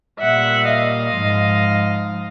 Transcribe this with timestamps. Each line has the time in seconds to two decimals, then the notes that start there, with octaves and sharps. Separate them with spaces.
0.20 A#2 G3 E5 F#5
0.68 D#5 F5
1.16 G#2 F3